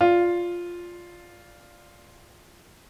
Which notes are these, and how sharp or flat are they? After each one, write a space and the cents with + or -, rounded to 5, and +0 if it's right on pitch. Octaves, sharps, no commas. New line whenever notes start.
F4 +0 D5 +0